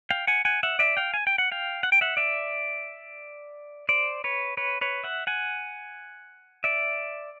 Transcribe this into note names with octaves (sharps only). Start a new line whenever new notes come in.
F5 G5
F#5 G#5
F#5 G#5
E5 F#5
D5 E5
F5 G5
G#5
G5
F#5
F5 G5
F#5
G5
E5 F#5
D5 E5
C5 D5
B4 C#5
B4 C#5
B4 C#5
E5 F#5
F#5 G#5
D5 E5